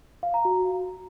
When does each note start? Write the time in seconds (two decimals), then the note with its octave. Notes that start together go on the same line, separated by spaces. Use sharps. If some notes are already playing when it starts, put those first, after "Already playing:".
0.23 F5
0.34 A#5
0.45 F#4